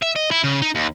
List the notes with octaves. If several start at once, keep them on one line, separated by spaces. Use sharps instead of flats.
E5
D#5
E4
C#3
D#4
D#2